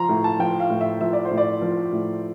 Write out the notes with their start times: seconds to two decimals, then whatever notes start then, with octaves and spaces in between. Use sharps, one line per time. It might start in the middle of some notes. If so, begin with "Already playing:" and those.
Already playing: F3 A#5 C6
0.09 A2
0.24 A5
0.39 F3 G5
0.60 F5
0.70 A2
0.81 E5
1.01 F3 E5
1.13 D5
1.25 C5
1.31 A2
1.38 D5
1.62 F3
1.92 A2